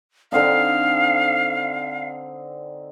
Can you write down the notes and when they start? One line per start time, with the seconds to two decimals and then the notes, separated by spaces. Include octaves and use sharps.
0.32 D3 C4 D#4 F5